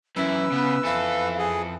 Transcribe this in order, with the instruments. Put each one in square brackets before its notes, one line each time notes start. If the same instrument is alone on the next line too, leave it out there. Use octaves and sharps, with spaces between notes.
[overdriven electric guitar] F#2 E3 [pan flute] C#4 [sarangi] E4 [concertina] B4 E6
[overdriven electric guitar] C#3 [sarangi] B3
[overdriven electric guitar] F2 A4 [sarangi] E3 [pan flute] F5
[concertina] G#4